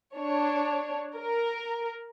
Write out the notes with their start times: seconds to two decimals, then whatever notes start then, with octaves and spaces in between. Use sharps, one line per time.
0.16 D4 C#5
1.15 A#4